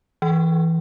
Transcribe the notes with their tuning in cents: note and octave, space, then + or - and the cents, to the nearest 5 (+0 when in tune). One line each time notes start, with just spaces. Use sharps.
E3 -5 G5 +0